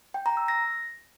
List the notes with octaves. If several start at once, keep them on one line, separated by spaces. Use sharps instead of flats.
G5
A#5
E6
A#6